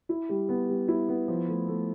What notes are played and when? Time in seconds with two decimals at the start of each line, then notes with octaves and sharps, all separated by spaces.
0.09 E4
0.29 G3
0.49 B3
0.69 G3
0.88 E4
1.09 B3
1.28 F3
1.48 A3
1.68 A3